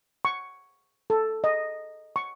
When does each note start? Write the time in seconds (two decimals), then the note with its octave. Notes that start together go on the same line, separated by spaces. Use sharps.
0.25 C#6
1.10 A4
1.44 D#5
2.16 C#6